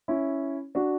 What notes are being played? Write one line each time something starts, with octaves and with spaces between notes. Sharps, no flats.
C#4 E4
D4 F#4